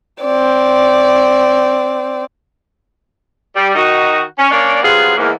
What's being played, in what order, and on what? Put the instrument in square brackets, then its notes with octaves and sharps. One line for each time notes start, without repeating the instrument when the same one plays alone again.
[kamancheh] C4 D5
[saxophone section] G3
D#3 D#4 F#4
C#4
A#3 C#4 D4 C#5 D5
F#3 G3 B3 C4 F4 G#4
E2 G#2 A#3